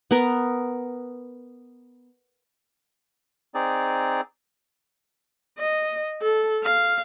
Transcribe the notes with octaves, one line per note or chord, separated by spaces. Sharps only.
B3 A#4
C4 D#4 G#4 D5
D#5
A4
F5